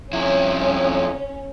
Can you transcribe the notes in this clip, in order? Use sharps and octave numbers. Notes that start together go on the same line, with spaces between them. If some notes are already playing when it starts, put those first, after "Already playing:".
F2 C#4 E4